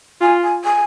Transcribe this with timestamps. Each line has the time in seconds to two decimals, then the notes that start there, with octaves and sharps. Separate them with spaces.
0.21 F4 G#5
0.43 G#5
0.64 G#5